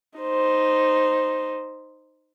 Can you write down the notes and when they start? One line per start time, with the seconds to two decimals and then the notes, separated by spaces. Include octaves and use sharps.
0.18 D#4 C5